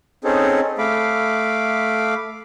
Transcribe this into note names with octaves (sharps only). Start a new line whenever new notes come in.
C4 C#4 D#4 G#4 A4
A3 F5 B5 D6